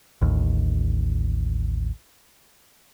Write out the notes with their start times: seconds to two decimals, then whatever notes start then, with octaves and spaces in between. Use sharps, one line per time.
0.21 A1 D#2